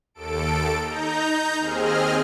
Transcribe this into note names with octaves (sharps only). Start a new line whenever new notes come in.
D#2 A4 D7
D#4 A#5 G6
D#2 C4 G#4 D#5 F6